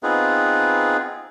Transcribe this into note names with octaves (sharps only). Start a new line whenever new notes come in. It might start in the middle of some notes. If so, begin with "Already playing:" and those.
B3 C4 D#4 F4 G#4 B4